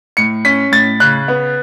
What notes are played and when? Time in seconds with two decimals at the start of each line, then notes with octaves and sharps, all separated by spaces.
0.17 A2 C#7
0.45 C#4 B6
0.72 A2 A6
1.00 C#3 F#6
1.28 B3